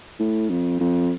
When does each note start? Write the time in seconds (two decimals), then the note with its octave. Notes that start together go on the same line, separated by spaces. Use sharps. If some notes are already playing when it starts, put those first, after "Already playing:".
0.19 A2
0.49 F2
0.80 F2